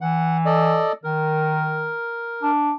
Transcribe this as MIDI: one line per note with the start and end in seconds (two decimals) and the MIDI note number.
0.01 0.83 52
0.01 0.37 78
0.45 0.92 69
0.45 0.92 74
0.45 0.92 75
1.04 1.94 51
1.04 2.51 70
2.43 2.73 62